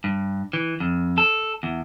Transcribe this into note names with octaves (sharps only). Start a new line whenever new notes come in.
G2
E3
F2
A4
E2